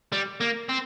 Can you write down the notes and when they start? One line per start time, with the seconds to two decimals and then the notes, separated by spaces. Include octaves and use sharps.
0.12 G3
0.41 A#3
0.69 C4